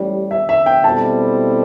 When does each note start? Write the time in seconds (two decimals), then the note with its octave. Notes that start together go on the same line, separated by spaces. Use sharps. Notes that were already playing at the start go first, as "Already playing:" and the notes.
Already playing: A1 A2 G3
0.31 E5
0.49 E5
0.66 G5
0.84 B2 G3 C4 E4 A4 A5